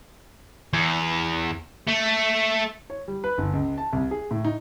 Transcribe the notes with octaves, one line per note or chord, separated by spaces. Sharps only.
E2
A3
C#5
G3
B4
G1
C#2
A5
C2
G#4
A2
D#4